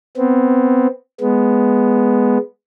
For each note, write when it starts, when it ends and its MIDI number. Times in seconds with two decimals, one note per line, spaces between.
0.17 0.87 59
0.17 0.87 60
1.20 2.37 56
1.20 2.37 59